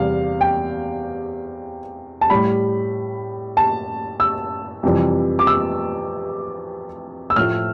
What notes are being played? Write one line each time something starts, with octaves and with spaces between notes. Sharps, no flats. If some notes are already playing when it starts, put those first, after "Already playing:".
Already playing: E2 C3 G3 F5
G5
A5
A2 G3 B5
A5
E6
F2 C3 E3 G3
D6
E6
E6
A2 F3 A3 F6